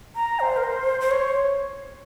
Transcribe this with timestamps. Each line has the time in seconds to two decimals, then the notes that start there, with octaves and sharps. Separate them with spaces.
0.15 A#5
0.40 C5
0.57 A#4
0.63 C5
1.00 C5
1.11 C#5